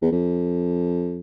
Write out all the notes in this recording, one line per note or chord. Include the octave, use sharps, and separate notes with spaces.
E2
F2